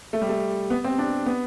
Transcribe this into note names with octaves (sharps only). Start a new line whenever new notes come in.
A3
G3
A3
B3
C4
D4
B3